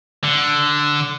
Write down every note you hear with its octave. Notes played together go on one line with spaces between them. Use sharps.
D3